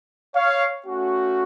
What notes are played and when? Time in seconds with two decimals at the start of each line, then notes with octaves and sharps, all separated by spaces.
0.35 C#5 F5
0.85 A3 C#4 F#4